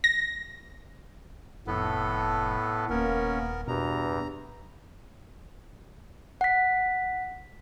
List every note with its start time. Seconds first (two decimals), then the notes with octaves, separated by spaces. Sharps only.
0.04 A#6
1.67 F1 A2 B3 A4
2.90 D#1 A#3 B3 C#4 A#4
3.68 E2 G2 B2 A#5
6.41 F#5 B6